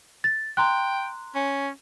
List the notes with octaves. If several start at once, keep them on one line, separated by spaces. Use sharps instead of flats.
A6
G5 A#5 C6 F#6
C#4